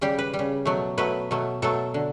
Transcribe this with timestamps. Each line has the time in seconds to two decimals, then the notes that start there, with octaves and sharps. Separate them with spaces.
0.01 C#3 G3 G4
0.18 B4
0.34 G3
0.39 C#3
0.65 B2 F#3 A3
0.98 B2 F#3 A3 B4
1.31 B2 F#3 A3
1.62 B2 F#3 A3 A4
1.94 D3